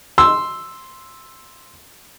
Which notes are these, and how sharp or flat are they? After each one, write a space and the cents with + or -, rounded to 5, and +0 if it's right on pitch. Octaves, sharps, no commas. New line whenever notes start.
C6 +0 E6 +0